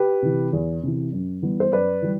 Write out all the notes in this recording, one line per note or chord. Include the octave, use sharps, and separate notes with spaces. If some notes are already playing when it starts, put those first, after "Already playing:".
Already playing: G4 B4
C3 E3
E2
C3 E3
F#2
E3 G3 B3
C5
F#2 B4 D5
E3 G3